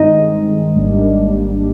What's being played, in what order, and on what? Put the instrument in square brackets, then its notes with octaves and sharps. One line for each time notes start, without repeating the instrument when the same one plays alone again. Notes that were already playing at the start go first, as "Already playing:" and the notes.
Already playing: [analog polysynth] G2 D#3 G#3 C4 [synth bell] D#4 D#5
[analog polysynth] G#1 G#2 G3 A#3 D4